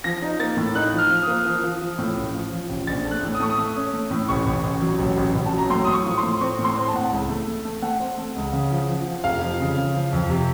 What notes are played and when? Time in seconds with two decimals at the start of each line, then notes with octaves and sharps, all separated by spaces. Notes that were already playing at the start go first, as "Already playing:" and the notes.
0.04 F3 A#6
0.22 D#4
0.40 A#3 A6
0.57 A2
0.75 D#4 F#6
0.93 F3
0.98 F6
1.10 F3
1.22 D#6
1.28 A#3
1.46 F3
1.64 F3
1.81 F3
1.98 A2
2.16 A1
2.34 F3
2.52 F3
2.69 A1
2.87 A#1 A6
3.04 A3
3.11 F#6
3.23 A2
3.35 D#6
3.40 A3 C#6
3.50 D#6
3.58 A3
3.76 C#4
3.94 A3
4.10 A2
4.28 A1 C#6
4.46 A1
4.64 A1
4.82 F#3
4.99 A1
5.17 A1
5.35 A1
5.46 A5
5.53 F#3
5.58 A#5
5.70 A2 C6
5.85 A2 D#6
5.93 C#6
6.06 F3
6.17 C6
6.23 A2
6.41 C4 C#6
6.59 A2
6.64 C6
6.77 C4
6.88 A5
6.94 A2 F#5
7.04 A5
7.12 C#2
7.29 A3
7.47 A3
7.65 A3
7.82 A3 F#5
8.00 C4
8.18 A3
8.36 C#2
8.53 C#3
8.71 F3
8.89 F3
9.07 F3
9.24 F1 F5
9.41 F3
9.59 C#3
9.78 C#3
9.94 F3
10.13 F2
10.30 C3